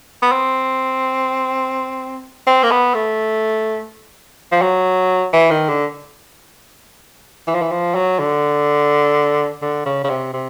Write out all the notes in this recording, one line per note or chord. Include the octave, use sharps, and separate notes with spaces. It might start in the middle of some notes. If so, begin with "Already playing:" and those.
B3
C4
C4
A#3
B3
A3
F3
F#3
E3
D#3
D3
E3
F3
E3
F3
F#3
D3
D3
C#3
C#3
C3
C3